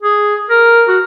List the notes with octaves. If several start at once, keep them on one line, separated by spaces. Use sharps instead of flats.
G#4
A#4
F#4